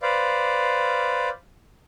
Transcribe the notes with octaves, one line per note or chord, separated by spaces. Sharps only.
B4 C5 D5 F5